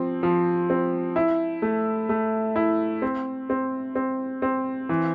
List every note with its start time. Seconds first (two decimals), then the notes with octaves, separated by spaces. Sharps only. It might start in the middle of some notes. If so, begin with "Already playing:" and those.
Already playing: F3 C4
0.23 F3
0.70 C4
1.16 E4
1.62 A3
2.09 A3
2.56 E4
3.02 C4
3.50 C4
3.96 C4
4.42 C4
4.89 E3